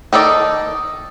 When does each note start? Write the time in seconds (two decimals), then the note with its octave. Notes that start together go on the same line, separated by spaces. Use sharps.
0.13 D#3 D#4 A4 D5